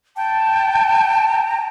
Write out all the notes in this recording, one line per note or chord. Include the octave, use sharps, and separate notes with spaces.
G5 A5